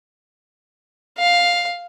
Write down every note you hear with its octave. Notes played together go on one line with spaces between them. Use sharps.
F5